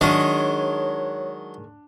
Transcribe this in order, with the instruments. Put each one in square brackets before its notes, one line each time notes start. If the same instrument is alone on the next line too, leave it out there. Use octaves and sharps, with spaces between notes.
[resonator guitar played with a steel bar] D#3 G#3 [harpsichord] F#3 D#5 [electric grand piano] D4 [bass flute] C#5